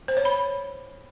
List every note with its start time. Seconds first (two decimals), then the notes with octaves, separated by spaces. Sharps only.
0.08 C5
0.17 C#5
0.25 B5